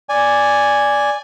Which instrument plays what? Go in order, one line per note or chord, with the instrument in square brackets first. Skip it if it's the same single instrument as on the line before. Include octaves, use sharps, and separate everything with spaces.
[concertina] D5 G#5